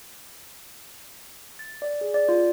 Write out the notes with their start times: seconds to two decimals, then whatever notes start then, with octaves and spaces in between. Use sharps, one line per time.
1.59 A6
1.82 D5
2.01 G#4
2.14 D5
2.29 F4